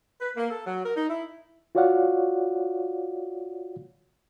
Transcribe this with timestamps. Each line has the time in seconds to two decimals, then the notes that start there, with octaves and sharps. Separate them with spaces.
0.21 B4
0.36 A#3
0.50 A4
0.66 F#3
0.85 A#4
0.97 D#4
1.10 E4
1.75 F4 F#4 C#5 D5 F5 F#5